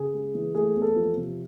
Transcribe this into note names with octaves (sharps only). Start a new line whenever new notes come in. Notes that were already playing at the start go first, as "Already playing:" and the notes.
Already playing: C#3 G#4
G#3
E3
A3 G#4
E2
A4
F3
C3